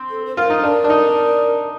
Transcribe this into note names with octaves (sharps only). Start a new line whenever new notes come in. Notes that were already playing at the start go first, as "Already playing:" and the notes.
Already playing: C4
A4
C5
F4 A#4
D#4
D4 A#4
D4
D#4